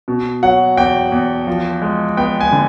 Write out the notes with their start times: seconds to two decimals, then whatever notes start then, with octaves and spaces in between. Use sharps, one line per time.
0.08 B2
0.43 F#3 F#5
0.77 E2 G5
1.12 E2
1.47 F3
1.82 G#3
2.17 B3 G5
2.41 G#5
2.52 D3